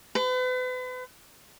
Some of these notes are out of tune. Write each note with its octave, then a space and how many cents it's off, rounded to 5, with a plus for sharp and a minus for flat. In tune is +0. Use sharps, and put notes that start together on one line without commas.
B4 +40